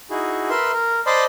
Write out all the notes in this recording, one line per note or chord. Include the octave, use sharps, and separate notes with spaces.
D#4 E4 F#4 G#4
A#4 B4 E5 C6
A#4
C5 D5 D#5 A5 B5 C6